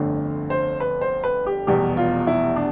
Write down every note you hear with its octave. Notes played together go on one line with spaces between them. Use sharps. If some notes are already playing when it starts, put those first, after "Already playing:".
Already playing: G1 F2 D3 A3
C5
B4
C5
B4
G4
F1 E2 B2 G3 G4
F4
E4
D4